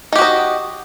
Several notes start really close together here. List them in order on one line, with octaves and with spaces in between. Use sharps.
D#4 G4 F#4 D#5